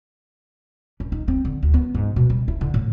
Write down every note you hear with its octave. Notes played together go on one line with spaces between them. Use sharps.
C#4
D#4
C4
D3
D2
B3
G#2
B2
G3
E4
D3
A2